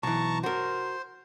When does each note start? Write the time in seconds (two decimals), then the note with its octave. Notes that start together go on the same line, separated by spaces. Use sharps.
0.03 B1 E3 A5 A#5 C#6
0.43 F#4 A#4 C5